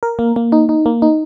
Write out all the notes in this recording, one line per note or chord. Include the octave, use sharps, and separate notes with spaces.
A#4
A#3
A#3
D#4
D#4
A#3
D#4